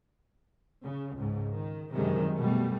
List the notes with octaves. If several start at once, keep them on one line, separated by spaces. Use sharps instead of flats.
C#3
C#2 G#2
D#3
F#2 C3 D#3 G3 G#3
B2 G3 A3